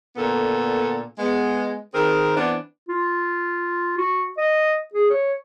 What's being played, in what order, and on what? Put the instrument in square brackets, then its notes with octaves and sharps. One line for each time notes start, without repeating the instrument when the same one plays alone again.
[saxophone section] A#2 D3 B3 A4
G#3 B3
D#3 C4 G#4 A#4
E3 B3 C4 D4
[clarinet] F4
F#4
D#5
G#4
C#5